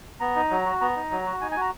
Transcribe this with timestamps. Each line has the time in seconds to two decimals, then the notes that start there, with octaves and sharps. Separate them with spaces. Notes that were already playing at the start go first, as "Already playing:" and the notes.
0.20 B3 A#5
0.36 D#4
0.51 F#3
0.66 F#4
0.81 B3 A#5
0.96 D#4
1.11 F#3
1.26 F#4
1.41 D#4 G#5
1.51 G#5
1.57 F#4 A#5